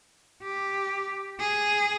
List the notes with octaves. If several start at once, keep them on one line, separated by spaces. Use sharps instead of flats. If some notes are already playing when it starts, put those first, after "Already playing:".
G4
G#4